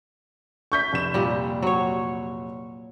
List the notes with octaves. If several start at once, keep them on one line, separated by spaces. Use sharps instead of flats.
C#6 G6 B6
F1 E7
A#2 G3
F#3 C#5